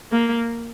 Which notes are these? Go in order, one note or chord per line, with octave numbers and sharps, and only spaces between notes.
A#3